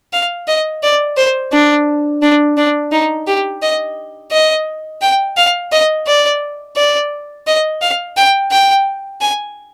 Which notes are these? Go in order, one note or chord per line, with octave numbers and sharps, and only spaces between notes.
F5
D#5
D5
C5
D4
D4
D4
D#4
G4
D#5
D#5
G5
F5
D#5
D5
D5
D#5
F5
G5
G5
G#5